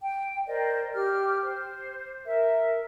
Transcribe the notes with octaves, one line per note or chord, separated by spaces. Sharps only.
G5
A#4 C5 D5 D#5
G4 F6
C5
A#4 E5